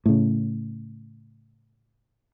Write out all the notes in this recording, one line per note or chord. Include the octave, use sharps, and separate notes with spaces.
A2 C#3